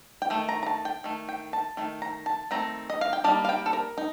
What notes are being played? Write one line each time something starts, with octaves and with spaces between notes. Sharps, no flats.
G5
D#3 A3
A#5
A#5
A5
G5
D#3 A3
G5
A5
D#3 A3
A#5
A5
D#3 A3 C4 A#5
D#5
F5
G5
G3 A#3 D#4 A5
F5
G5
A4
A#4
D#4